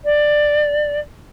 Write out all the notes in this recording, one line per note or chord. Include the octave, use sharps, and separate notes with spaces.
D5